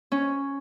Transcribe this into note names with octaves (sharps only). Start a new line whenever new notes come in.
C#4